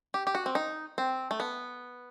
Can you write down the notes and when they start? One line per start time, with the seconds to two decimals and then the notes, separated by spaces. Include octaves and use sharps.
0.14 G4
0.27 G4
0.35 F#4
0.46 C4
0.55 D#4
0.98 C4
1.31 A3
1.40 B3